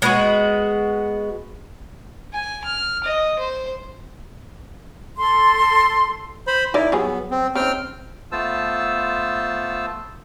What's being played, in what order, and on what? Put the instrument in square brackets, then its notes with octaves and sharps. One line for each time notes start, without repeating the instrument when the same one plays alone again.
[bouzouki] G#3 B3 F#4
[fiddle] G#5
F6
D#5
C5
[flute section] A4 C6
[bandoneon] C5 B5
[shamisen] D#4 A#4 D5 [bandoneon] E4
[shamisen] F#3 G3 G#4 [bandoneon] B3
[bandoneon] C4
[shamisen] C#3 D#4 [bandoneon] C4 G5 F6
[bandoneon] A3 B3 F4 C5 A5 E6